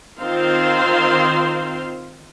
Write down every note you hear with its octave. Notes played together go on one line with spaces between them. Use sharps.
D#3 C4 F4 C5 F5 C6